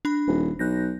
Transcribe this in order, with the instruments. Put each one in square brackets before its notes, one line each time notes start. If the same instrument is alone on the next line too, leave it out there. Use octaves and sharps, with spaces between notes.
[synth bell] D4 B5
[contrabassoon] D#1
[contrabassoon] B1 [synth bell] F#6 G6 A#6